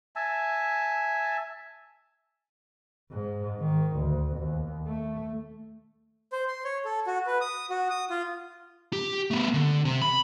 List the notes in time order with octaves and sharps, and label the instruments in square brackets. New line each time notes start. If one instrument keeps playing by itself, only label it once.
[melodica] E5 G#5 A5
[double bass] G#2
D#3
D2
D#2
A3
[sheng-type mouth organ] C5
C6
C#5
A4
F#4
B4
D#6
F#4
D#6
F4
[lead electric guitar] G4
A3 B3
D3
C3
B5